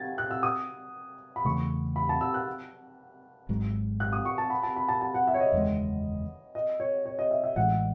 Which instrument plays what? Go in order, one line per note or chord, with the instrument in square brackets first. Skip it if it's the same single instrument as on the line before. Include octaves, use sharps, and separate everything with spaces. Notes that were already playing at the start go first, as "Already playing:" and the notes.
Already playing: [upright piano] G#6 A6
F#6
E6
D#6
B5
[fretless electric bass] E2 C#3 E3 A3 [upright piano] C#6
[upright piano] B5
A5
E6
F#6
[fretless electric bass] G#1 G#2 F#3
[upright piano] F#6
D#6
C#6
A5
B5
A5
B5
A5
A5
F#5
E5
C#5
D#5
[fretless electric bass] F#1 E2 D#3 G#3
[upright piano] D#5
C#5
C#5
D#5
E5
E5
[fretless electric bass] A1 A2 E3 G#3 [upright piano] F#5